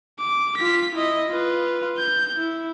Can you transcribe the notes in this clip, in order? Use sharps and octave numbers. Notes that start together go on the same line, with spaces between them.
D6
F4 B6
E4 D#5
F4 B4
G6
E4